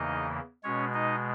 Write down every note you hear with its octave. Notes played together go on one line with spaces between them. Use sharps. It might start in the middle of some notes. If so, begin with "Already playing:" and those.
Already playing: E2 C#3 E3 A#3 D#4 D#5
B2 G#3 C#4 C#5
D#4 D#5